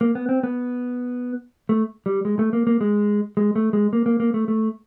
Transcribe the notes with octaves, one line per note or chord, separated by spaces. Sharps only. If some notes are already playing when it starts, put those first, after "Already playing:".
A#3
B3
C4
B3
A3
G3
G#3
A3
A#3
A#3
G#3
G#3
A3
G#3
A#3
A#3
A#3
A3
A3